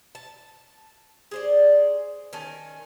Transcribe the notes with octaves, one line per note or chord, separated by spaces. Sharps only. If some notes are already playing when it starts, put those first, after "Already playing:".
A5
G#4 C5 D5
D#3 C#4 G#5 A5